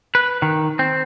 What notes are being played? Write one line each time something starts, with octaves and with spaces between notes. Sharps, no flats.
B4
D#3
C4